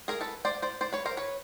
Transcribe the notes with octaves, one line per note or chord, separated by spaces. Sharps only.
G#4 A#4
A4 B4
C5 D5
C5 D5
C5 D5
B4 C#5
A#4 C5
B4 C#5